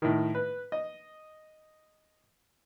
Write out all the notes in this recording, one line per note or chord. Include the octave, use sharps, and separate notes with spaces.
A2 D#3
B4
D#5